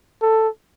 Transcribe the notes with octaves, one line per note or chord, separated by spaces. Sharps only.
A4